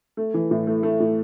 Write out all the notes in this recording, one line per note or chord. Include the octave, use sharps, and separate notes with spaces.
A3
E3
A2
A3
A3
A2